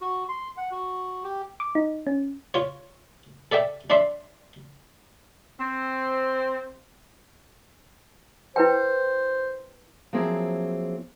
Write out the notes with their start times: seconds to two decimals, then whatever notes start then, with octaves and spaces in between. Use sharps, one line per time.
0.01 F#4
0.29 C6
0.57 F#5
0.71 F#4
1.24 G4
1.60 D6
1.75 D#4
2.07 C#4
2.54 F4 C#5
3.52 A4 D5 E5 G5
3.90 D4 D5 E5 C6
5.60 C4 C5
8.56 E4 B4 C5 G5
10.13 F3 F#3 A#3 C4 E4 G#4